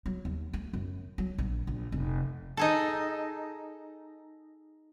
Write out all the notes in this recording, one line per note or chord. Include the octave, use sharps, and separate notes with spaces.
F#3
D#2
A3
F#2
F#3
A#1
A#1
F1
D#4 G#4 A4